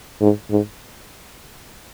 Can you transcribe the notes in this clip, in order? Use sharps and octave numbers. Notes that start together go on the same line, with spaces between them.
G#2
G#2